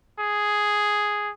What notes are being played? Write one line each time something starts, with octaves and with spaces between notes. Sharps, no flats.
G#4